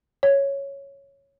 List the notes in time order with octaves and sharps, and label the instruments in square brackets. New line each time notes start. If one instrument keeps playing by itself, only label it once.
[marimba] C#5